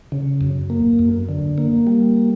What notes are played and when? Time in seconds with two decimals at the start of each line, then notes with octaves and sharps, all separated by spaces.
0.12 C#3
0.41 F#2
0.70 A#3
0.99 F#2
1.29 D3
1.58 A#3
1.87 G3